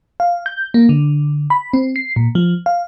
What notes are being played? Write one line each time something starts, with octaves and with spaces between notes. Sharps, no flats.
F5
G6
A#3
D3
B5
C4
C7
A#2
F3
F5